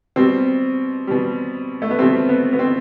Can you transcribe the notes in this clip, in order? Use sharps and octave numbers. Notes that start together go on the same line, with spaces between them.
B2 G3 C4
B2 G3
A3
B3
B2 G3 C4
B3
B3
C4